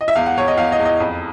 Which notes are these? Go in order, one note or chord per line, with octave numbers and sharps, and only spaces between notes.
D#5
E5
E2 F5
F#5
E2 C#5
D#5
E2 F5
D#5
E2
D#5
F2